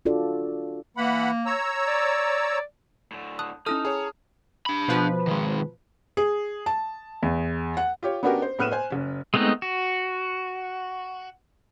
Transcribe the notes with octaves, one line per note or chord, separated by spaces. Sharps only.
D4 F4 F#4 A4 D5
E3 A#3 F#5 B5
C#5 A#5 E6
D5
A2 D3
A5 D#6 F#6
C#4 D#4 E4 A4 A5 D#6 F6
G#4 C#5 A#5
D4 B5
B2 F3 B4
D#3 G#3
G#4
A5
E2
F#5
F4 G4 C#5
B3 C#4 D4 F#4 G4 A#4
C5
A2 B3 F6 F#6 D#7 E7
C5 G#5
F#1 C#4
G#3 A3 B3 C4 D#4
F#4